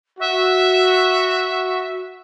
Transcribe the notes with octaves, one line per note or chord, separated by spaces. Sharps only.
F#4 E5